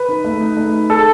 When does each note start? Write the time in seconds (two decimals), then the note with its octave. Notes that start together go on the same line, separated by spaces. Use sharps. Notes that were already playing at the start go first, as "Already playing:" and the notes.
Already playing: B4
0.09 D#4
0.25 A3
0.41 D#4
0.57 A3
0.73 D#4
0.90 A4